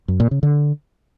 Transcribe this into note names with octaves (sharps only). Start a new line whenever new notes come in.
F#2
A#2
C#3
D3